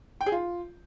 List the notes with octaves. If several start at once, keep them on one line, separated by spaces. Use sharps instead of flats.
G5
G#4
F4